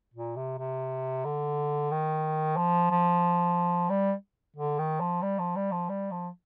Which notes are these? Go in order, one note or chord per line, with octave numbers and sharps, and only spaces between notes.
A#2
C3
C3
D3
D#3
F3
F3
G3
D3
D#3
F3
G3
F3
G3
F3
G3
F3